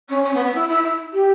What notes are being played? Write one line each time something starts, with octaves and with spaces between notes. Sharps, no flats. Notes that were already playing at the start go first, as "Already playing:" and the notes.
C#4
C#4
B3
B3
E4
E4
E4
G4